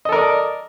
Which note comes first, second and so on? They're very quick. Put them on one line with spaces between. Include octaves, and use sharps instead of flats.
D#5 A4 A#4 D5